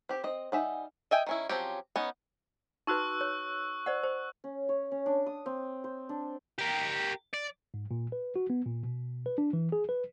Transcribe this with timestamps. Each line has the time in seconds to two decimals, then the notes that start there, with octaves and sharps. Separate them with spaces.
0.09 C4 G4
0.24 C4 D#5
0.52 G3 D#4 E5 F#5 G#5
1.11 D#5 E5 G5 G#5
1.27 D#3 C#4 E4
1.49 F3 F#3 C4 C#4 G4
1.96 B3 C#4 D#4
2.87 D#4 F#4 B4 C#6 E6 F#6
3.21 C#5
3.86 C5 D5 F#5
4.04 C5
4.44 C#4
4.69 C#5
4.92 C#4
5.06 D4
5.26 D#6
5.46 C4
5.84 C5
6.09 D4
6.58 G4 A#4
7.33 D5
7.74 G#2
7.91 A#2
8.12 B4
8.36 F#4
8.50 B3
8.66 A#2
8.83 B2
9.26 B4
9.38 D4
9.53 E3
9.72 G#4
9.89 B4